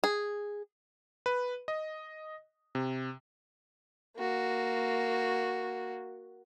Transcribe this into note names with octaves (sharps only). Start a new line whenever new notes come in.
G#4
B4
D#5
C3
A#3 F#4